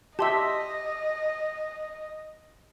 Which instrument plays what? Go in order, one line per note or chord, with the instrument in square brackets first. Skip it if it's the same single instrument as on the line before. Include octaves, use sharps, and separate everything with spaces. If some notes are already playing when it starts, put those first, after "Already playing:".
[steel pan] G4 E5 [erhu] D#5 [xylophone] A5 C6 E6